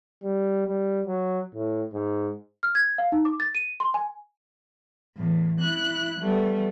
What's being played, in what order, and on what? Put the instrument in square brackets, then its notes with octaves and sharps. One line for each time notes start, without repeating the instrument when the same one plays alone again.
[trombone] G3
G3
F#3
A2
G#2
[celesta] F6
G#6
F5
D#4
D6
A6
D#7
C6
G#5
[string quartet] E2 A2
E4 F#6
G3 A3 B3